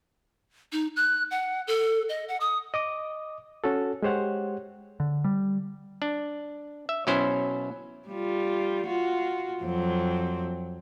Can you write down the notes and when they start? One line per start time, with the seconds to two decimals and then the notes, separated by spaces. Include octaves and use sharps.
0.72 D#4
0.96 F#6
1.31 F#5
1.67 A4
2.09 D#5
2.28 F#5
2.40 D#6
2.74 D#5 D6 D#6
3.64 C#4 F#4 A4
4.02 G#3 G4 C5 C#5 F#5
5.00 D3
5.24 G3
6.02 D4
6.89 E5
7.07 B2 F#3 C#4 E4 C5
8.09 G3 F4
8.87 F4 F#4
9.63 F2 F#3 C4